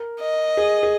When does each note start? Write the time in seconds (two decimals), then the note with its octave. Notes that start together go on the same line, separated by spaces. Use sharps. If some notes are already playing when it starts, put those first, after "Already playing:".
Already playing: A#4
0.20 D#5
0.57 G#4
0.83 G#4